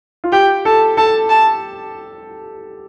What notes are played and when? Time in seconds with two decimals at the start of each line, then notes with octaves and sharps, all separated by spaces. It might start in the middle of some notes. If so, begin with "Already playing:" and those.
0.24 F4
0.32 G4 G5
0.65 A4 A5
0.97 A4 A5
1.29 A5